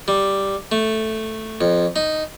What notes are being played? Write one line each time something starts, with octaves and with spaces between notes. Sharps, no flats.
G3
A3
F2
D#4